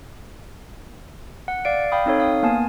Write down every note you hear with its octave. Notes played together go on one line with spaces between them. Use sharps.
F#5
D5 F5 D7
F5 G5 B5 D#6
C4 D#4 A4 C#5
F5 D#6
A#3 B3 G#5 A5